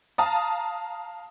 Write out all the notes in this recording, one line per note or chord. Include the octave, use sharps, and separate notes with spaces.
F5 A5 A#5 D#6